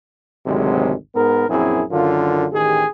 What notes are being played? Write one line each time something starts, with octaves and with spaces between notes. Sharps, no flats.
G#1 D2 C3 F#3 G#3
G#2 B3 A#4
A#1 F#2 C4 E4 G#4
F#2 D3 D#3 F4
A1 D#3 G4 G#4